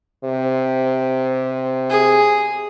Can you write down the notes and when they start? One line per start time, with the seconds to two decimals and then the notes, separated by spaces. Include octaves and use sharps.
0.24 C3
1.90 G#4